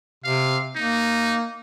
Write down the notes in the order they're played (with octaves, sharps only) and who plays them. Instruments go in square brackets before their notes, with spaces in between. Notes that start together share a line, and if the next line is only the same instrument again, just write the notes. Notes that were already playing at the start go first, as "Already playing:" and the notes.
[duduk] C3 [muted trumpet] F5
[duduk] A#3 [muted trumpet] D#4